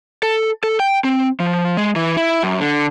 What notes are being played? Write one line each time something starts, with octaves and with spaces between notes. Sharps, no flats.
A4
A4
G5
C4
F3
G#3
E3
E4
F#2
D3